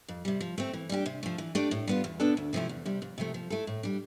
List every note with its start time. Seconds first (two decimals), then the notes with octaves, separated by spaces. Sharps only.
0.08 F2
0.25 C3 G3
0.40 F3
0.58 A3 C4
0.73 E3
0.89 G3 D4 G4
1.06 C3
1.23 F3 A3
1.38 E3
1.55 A3 D4 G4 D5
1.71 A2
1.88 G3 B3 F4
2.04 E2
2.20 B2 B3 D4 A4
2.37 D2
2.53 C3 F3 A3 E4
2.69 E2
2.85 C3 G3
3.02 F2
3.18 C3 F3 A3
3.34 F3
3.50 A3 E4 A4
3.67 A2
3.83 G3 D4